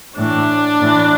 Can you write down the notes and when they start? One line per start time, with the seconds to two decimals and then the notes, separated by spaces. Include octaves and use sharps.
0.17 A2 E3 D4
0.80 A2 E3